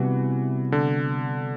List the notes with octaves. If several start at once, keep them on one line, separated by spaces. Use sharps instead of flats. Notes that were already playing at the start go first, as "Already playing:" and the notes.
Already playing: C3 E3 G3 B3 F#4
D3